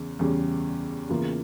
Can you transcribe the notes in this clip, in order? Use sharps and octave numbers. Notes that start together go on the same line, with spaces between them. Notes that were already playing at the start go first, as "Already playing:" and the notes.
Already playing: E2 C#3
E2 C#3 G3 C#4
E2 C#3 E3 A#3 F4